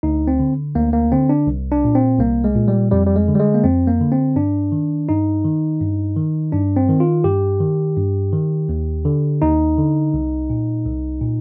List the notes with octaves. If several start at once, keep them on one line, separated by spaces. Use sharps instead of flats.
D2 D#4
C4
D3
D2 A#3
A#3
D3 C4
D4
C2
D4
A#2
C4
C2 A#3
G#3
A#2
G3
F2 G3
G3
G#3
D3
G3
G#3
A#3
F2 C4
A#3
D3
C4
G2 D4
D#3
G2 D#4
D#3
G2
D#3
G2 D4
C4
D#3
F4
G2 G4
D#3
G2
D#3
D#2
D3
D#2 D#4
D3
C2
A#2
C2
A#2